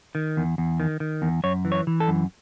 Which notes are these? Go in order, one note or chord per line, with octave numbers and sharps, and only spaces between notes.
D#3
E2
E2
D#3
D#3
E2
F#2 C#5
E3
C#5
E3
A4
F#2